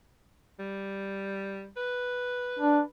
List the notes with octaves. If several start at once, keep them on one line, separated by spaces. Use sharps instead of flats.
G3
B4
D4